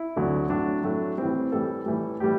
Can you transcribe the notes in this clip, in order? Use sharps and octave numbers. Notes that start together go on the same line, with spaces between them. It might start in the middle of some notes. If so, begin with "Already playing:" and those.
Already playing: E4
D2 D3 F#3 A3
A2 F#3 A3 D4
A2 F#3 A3
A2 E3 G3 C4
A2 E3 G3 A4
A2 E3 G3
A2 E3 G3 G4